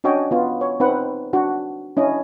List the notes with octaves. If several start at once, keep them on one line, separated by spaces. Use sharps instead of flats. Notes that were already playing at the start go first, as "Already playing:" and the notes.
C#4 D4 F#4 C#5 D#5 G5
B3 F4
C#5
C4 D#4 B4 F#5
D4 F#4
C#4 D4 E4 D#5